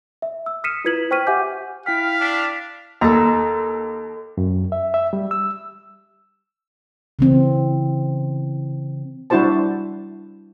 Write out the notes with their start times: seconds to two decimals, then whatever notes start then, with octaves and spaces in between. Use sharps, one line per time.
0.22 E5
0.46 E6
0.64 D#6 F6 B6 C#7 D#7 E7
0.85 E4 F4 B4 G#6 B6 F#7
1.11 C5 G5 C#6 F6 B6 D#7
1.27 G4 E5 F#5 G#5 D6 G6
1.86 E4 F5 G5 F6 B6
2.20 D4
3.01 D#2 A4 A#5
4.38 F#2
4.72 E5
4.94 E5
5.13 G3
5.31 E6
7.19 C#3 E3 C4
9.30 G3 D4 E4 F#4 C5 A5